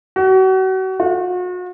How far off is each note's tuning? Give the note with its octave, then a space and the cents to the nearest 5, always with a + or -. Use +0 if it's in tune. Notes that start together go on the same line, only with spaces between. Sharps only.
F#4 +35
F#4 -40